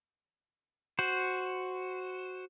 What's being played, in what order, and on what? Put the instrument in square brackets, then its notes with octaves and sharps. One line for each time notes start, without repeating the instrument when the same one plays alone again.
[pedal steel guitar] F#4 C5